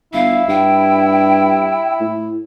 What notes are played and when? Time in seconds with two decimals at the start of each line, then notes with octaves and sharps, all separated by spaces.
0.13 G1 E4 F5
0.48 G2 G5
2.00 A2